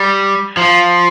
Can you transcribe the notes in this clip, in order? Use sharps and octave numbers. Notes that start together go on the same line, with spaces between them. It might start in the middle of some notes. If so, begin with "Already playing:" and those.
Already playing: G3
F3